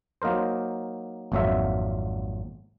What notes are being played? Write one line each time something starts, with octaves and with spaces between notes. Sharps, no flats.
F#3 A#3 D#4 A#4 C5
G#1 F2 A#2 F#3 F4 E5